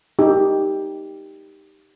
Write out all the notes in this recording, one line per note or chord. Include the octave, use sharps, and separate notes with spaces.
D#4 G4